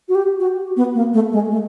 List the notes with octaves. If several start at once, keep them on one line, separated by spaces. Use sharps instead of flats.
F#4
G4
F#4
B3
A#3
A3
G#3
A3